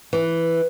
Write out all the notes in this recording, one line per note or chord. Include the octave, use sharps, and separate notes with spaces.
E3